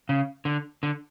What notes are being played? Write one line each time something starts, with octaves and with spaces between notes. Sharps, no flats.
C#3
D3
D3